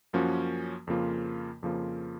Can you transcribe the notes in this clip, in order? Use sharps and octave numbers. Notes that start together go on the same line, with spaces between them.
F#2 F3 A#3 C#4 F#4
F2 C#3 F3 A#3 F4
F2 C#3 F3 A#3 F4